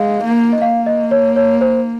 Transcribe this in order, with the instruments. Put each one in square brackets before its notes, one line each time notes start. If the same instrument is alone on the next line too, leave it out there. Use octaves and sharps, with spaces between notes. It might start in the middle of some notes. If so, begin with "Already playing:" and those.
Already playing: [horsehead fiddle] G#3 [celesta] F5
[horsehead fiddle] A#3
[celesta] D#5
[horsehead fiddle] A#3 [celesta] F5
[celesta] D#5
C#5
C#5
C5